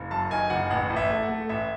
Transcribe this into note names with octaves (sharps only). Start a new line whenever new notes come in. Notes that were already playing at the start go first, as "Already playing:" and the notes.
Already playing: F#1
F#2 A5
D#3 G#5
F#1 F#5
A1 F#5
A1
E5
A3
F#5
A3
A1 E5